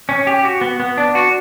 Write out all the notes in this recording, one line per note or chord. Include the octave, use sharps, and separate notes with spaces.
C#4
G4
F#4
B3
B3
D4
F#4